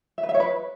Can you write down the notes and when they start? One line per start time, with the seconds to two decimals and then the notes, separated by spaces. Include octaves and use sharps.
0.18 E5
0.23 B4
0.29 E5
0.34 C#5
0.40 B4